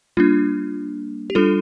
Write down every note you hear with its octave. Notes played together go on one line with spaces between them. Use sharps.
G3 A#3 D4 F4
G4
G3 D4 F4 A4